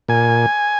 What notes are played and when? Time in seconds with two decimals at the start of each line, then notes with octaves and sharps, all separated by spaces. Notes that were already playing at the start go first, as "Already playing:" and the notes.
0.08 A#2 G#5